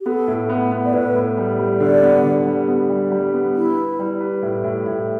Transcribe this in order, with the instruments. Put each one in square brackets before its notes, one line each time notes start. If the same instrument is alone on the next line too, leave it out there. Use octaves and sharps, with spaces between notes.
[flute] G4
[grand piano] B3 [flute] A4
[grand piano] A2
B3
B3
[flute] D5
[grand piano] A2 [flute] B4
[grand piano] A2
G3
G3
[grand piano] D3 [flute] D5
[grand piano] B3
D3
G3
B3
G3
G3
B3
[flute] E4 [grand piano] B4
[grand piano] B4
G3
B4
A2
A2
A2